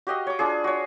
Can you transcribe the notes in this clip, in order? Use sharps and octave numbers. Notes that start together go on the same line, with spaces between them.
F#4 G4 D#5 F5
C#5 D6
D4 F4 G#4
F#4 C#5